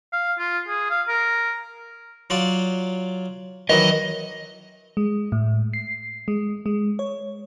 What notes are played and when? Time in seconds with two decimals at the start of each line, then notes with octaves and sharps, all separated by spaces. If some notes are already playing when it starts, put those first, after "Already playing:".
0.13 F5
0.39 F4
0.68 G#4
0.90 F5
1.09 A#4
2.30 F#3 F4 D5
3.69 D#3 E3 F#3 D#5
4.97 G#3
5.32 A2
5.73 C7
6.28 G#3
6.66 G#3
6.99 C#5